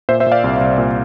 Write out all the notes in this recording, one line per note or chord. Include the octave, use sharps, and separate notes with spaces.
A#2 C5 E5
C5 E5
A#2
D5 F5
C2
C2
A#2